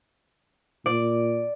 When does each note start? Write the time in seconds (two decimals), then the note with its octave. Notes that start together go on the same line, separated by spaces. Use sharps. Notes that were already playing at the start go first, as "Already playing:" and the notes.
0.86 A#2 D5